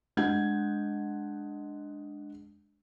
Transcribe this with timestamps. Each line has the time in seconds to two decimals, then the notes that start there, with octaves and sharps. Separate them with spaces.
0.17 G#3 D4 F#5 G6 G#6